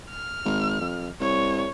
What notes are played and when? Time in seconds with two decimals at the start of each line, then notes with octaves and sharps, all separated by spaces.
0.10 F6
0.45 G#1
0.81 F2
1.20 C2 C#5